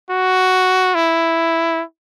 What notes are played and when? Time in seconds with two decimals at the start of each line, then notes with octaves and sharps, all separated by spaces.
0.10 F#4
0.95 E4